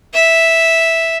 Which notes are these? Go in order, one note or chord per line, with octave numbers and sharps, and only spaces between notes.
E5